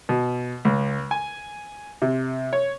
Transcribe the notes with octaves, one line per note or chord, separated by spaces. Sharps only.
B2
C#2
G#5
C3
C#5